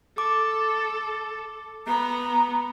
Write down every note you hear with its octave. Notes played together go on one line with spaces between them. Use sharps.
A4 D6
B3 A#5